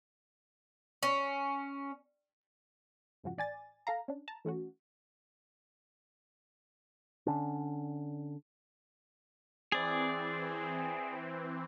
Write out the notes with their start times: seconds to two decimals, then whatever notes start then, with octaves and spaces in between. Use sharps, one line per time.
1.03 C#4
3.23 F2 G#2 C#3 F3 F#4
3.37 A1 D5 G#5 A6
3.87 A4 F5 A#5
4.08 C#4 D4
4.28 A5 A#5
4.45 E3 A3 C#4 F#4
7.26 D3 C#4 D4
9.72 E3 C4 G#4 D5